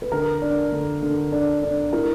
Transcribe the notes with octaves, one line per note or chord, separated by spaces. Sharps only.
B4
D3 A#4
D4
D3
D3
D4
D4
E4 A#4